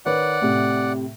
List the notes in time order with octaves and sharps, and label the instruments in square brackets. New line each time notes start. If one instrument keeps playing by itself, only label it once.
[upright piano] D#3 B4 C#5 [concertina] D5 F#5
[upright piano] A2 C3